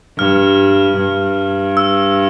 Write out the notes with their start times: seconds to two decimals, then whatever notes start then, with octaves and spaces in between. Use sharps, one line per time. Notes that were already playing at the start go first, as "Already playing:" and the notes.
0.18 G2 F6
0.97 G2
1.77 E6